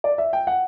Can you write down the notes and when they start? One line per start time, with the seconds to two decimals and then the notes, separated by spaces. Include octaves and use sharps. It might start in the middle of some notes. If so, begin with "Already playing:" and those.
0.04 D5
0.18 E5
0.33 G5
0.47 F#5